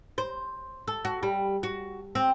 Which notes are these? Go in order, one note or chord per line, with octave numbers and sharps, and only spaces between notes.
C5
A4
F#4
G3
F#4
C4